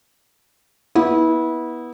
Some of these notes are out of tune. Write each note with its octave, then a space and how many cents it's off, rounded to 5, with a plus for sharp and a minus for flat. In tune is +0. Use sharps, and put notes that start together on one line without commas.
B3 -15 E4 -25